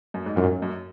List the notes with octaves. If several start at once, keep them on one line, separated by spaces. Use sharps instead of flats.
F#2
G#2
F#2 A#2
F#2